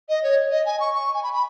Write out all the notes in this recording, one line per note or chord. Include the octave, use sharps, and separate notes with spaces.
D#5
C#5
D#5
G#5
C#6
C#6
G#5
B5
B5